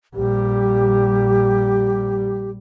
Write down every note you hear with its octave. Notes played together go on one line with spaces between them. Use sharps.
A#1 G3 G4